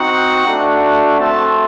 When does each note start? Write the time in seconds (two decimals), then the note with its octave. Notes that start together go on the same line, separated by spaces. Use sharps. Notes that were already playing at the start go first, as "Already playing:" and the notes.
Already playing: C4 D#4 F#4 F#5
0.46 A3 D4 F#4
1.17 A3 C4 F#4 A5